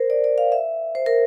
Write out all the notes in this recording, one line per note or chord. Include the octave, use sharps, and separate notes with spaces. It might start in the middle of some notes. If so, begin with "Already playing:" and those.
Already playing: A#4 C5
D5
D5
F5
E5
C5
A#4